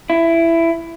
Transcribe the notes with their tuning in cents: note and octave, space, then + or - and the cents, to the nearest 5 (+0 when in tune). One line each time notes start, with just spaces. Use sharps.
E4 +15